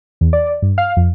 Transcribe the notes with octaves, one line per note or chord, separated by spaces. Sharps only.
E2
D5
G2
F5
F2